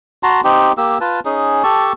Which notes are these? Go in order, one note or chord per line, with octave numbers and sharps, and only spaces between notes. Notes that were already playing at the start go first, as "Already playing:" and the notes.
F#4 A5 A#5 C6
C4 D#4 G4
A#3 G4 E6
F4 B4 A5
C#4 D#4 G#4
G4 A4 A5 C#6